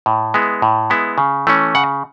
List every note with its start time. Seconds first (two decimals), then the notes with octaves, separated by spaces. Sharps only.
0.06 A2
0.34 G#3 B3 E4
0.62 A2
0.90 G#3 B3 E4
1.18 C#3
1.47 E3 A3 C#4
1.75 C#3 F#5